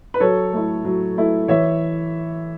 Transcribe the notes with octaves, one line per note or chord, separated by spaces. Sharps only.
B4
F#3 A4 C#5
A3 E4
F#3
A3 E4
E3 C#5 E5